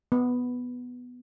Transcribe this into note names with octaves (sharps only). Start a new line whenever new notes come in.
B3